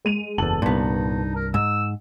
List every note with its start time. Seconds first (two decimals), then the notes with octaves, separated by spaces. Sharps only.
0.05 G#3 D#7 F7
0.38 F#1 E2 A4 A5 F#7
0.62 C2 G2 A#2 B3 D#4
1.36 A#4
1.54 G#2 E6